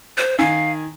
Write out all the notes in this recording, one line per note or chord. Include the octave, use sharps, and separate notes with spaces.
C5
D#3 F5 G#5